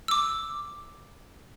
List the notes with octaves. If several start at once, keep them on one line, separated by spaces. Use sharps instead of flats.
D6 E6